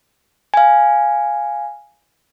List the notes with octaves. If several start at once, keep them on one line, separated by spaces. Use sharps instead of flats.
F5 G#5